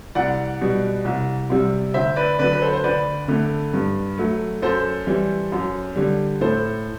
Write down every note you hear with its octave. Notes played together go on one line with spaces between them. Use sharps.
C2 D5 F#5
B2 G3
C2
C3 G3
D2 C5 E5
B4 D5
D3 F#3 B4 D5
B4
A4 C5
C5
D2 B4 D5
D3 A3
G2
F#3 A3
F#2 A4 C5
E3 G3
F#2
D3 G3
A2 A4 C5